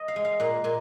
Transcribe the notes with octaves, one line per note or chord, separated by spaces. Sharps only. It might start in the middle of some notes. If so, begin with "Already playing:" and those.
Already playing: D#5
F5
G#3
F5
A#2 F#5
A#2 G#5